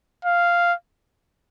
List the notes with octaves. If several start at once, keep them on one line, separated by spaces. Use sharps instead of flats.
F5